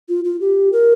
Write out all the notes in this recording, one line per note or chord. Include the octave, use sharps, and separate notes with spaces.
F4
F4
G4
A#4